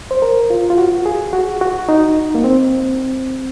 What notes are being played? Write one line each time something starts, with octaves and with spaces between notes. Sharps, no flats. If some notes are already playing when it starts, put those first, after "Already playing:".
C5
A#4
F4
F4
F#4
G#4
F#4
F#4
D#4
A#3
C4